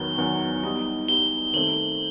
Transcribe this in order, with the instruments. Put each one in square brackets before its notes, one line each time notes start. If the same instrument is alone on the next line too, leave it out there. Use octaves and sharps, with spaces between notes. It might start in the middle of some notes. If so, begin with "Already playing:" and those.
Already playing: [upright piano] E2 D#3 F#3 B3 [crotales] G7
[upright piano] E2 D#3 F#3 B3
G3 B3 D#4
[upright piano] G3 B3 D#4 [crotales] G7
[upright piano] D#3 A3 C4 [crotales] F#7